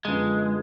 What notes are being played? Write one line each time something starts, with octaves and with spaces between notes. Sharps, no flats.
F#2 D3 F3 G#3 B3